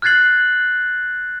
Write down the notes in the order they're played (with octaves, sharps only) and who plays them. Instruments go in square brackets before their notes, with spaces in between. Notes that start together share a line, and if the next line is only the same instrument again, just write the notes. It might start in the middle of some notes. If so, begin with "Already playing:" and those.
[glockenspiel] F6 F#6 G#6 A6 C7 F#7